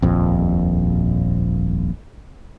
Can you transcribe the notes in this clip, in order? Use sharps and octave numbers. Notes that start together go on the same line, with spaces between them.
D#1 A#1 F2